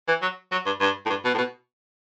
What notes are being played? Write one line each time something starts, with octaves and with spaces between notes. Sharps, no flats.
E3
F#3
F#3
G2
G2
A2
G2
B2
A2
B2